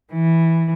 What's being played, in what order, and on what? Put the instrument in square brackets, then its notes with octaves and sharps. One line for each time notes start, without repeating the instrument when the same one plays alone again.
[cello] E3